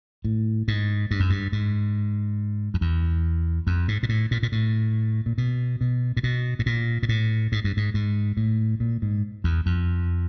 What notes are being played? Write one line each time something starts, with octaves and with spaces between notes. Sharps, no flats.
A2
G#2
G2
F#2
G2
G#2
F2
E2
F2
G#2
A#2
A2
A#2
A#2
A2
A#2
B2
B2
A#2
B2
A2
A#2
A#2
A2
G#2
G2
G#2
G#2
A2
A#2
G#2
E2
F2